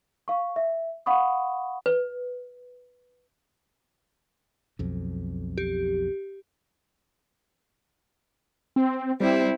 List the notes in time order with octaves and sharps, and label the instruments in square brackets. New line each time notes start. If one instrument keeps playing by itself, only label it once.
[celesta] F5 C#6
E5
F5 F#5 B5 C#6 D#6
[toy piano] B4
[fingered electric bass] B1 F2
[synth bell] G4
[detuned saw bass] C4
[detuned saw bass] G3 [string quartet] C4 E4